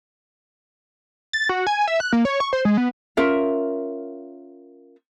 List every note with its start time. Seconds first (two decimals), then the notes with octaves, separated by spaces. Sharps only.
1.33 A6
1.49 F#4
1.67 G#5
1.88 E5
2.00 F#6
2.13 A#3
2.25 C#5
2.40 C#6
2.53 C5
2.65 G#3
2.77 B3
3.17 C#4 F4 A#4 E5